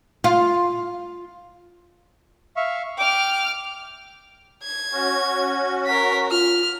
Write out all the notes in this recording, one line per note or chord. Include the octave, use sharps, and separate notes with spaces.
F4
E5 F5 C#6
G5 D6 F6
G#6
C#4 F#4
A#4 B6
F4 F6